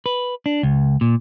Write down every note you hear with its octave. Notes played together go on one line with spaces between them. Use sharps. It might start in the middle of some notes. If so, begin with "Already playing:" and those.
B4
D4
C#2
A#2